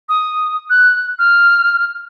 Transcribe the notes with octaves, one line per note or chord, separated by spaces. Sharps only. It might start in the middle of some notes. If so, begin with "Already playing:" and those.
D#6
F#6
F6